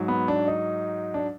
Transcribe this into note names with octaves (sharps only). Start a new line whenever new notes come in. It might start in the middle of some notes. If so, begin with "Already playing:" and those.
Already playing: G#2 F#3
B3
D4
D#4
D4